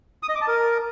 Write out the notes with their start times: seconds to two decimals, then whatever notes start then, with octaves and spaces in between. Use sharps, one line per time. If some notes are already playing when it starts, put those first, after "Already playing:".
0.23 D#6
0.29 D#5
0.35 D6
0.41 A5
0.47 A#4